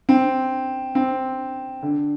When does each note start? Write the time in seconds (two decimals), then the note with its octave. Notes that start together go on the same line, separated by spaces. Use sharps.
0.09 C4
0.95 C4
1.82 D3